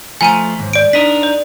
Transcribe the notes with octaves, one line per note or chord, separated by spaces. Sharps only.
F3 A3 G#5 A#5 D#7
D#2 G#2
D5 D7
D4 D#4 A#4 B6
D5